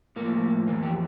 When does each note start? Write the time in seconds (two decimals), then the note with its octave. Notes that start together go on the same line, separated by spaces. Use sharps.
0.16 A2 F3 A#3
0.67 F2 E3 A#3
0.83 G4